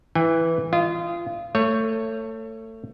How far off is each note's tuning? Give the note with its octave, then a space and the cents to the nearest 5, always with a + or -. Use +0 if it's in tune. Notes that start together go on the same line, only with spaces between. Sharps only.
E3 +0 G#5 -40
F4 -25 D#5 +0
A3 +25 C#5 +0